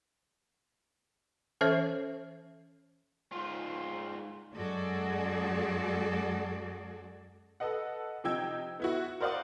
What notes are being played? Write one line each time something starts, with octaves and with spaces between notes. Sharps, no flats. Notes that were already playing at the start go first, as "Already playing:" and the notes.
E3 C#4 A4 C5 C#5 E5
G#2 F4
F#2 G#3 F#4 G#4 A4 D5
A4 B4 D#5 F#5
C3 F3 D#4 G5 E6 G#6
B3 E4 F#4
A#4 C5 D5 F5 F#5 D#6